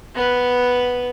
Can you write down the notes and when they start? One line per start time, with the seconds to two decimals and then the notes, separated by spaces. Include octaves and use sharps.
0.15 B3 B4